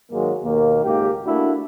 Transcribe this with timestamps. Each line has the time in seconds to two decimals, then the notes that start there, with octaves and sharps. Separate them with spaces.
0.11 G#2 D#3 F#3 G#3 A#3
0.42 D#2 B2 D#3 A#3
0.83 C#2 G#2 A#3 G4
1.25 A3 A#3 D4 E4 F#4